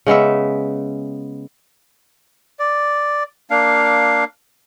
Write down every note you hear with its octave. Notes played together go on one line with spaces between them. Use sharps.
C#3 G#3 B3 E5
D5
A#3 D4 F5